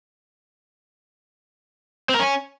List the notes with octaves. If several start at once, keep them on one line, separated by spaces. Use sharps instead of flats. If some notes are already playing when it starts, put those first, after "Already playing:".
C4
A#4
C#4